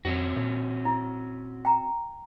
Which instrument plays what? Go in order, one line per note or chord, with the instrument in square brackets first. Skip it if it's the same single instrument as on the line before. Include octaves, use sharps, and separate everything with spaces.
[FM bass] F2 [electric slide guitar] C4 C#4 F#4
[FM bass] A#2
[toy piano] E4
G5 A#5